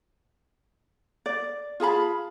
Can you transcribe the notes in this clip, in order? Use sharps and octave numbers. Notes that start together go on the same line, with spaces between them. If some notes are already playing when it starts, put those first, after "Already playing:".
D5
F4 G#4 A5 B5